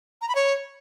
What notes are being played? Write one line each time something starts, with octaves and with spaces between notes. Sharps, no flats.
A#5
B5
C#5